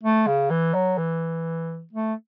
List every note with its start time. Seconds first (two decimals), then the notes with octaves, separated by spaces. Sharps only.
0.03 A3
0.27 C#3
0.50 E3
0.74 F#3
0.98 E3
1.93 A3